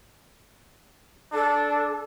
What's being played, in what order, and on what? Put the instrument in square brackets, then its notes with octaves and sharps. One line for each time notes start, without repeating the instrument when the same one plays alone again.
[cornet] D4 [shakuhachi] A4